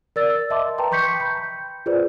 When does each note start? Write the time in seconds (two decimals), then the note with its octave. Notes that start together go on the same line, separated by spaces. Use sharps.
0.16 A#4 D5 E6 A6
0.50 D#5 E5 A5 C6 D6
0.78 B4 G5 A5 A#5 C6
0.91 G5 C6 C#6 G6 B6 C#7
1.20 B5 G6
1.86 F4 G#4 B4 C5 D5